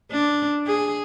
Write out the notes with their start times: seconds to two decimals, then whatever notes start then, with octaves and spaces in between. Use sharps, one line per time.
0.12 D4
0.67 G#4